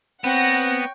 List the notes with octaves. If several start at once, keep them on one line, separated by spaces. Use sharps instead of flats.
B3 C4 C#5 F#5 G5 A#6